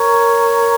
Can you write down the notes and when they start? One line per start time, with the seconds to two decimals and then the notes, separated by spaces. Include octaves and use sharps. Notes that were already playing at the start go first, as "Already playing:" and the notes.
Already playing: A#4 C#5